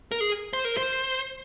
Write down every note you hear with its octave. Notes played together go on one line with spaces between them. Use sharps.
A#4
G#4
C5
A#4
C5